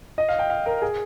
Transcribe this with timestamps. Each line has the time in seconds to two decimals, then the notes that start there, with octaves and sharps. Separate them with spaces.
0.18 D#5
0.29 F5
0.39 G5
0.50 F5
0.66 A#4
0.82 G#4